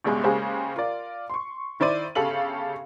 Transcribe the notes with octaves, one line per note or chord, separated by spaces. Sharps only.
G1 C#2 G2 B2 G#3
C#3 G#3 A#3 G4 G#4 C5
F4 A#4 D5
C6 C#6
D#3 E4 C5 D5 D#7
G1 C#3 G4 A4 F5 F#7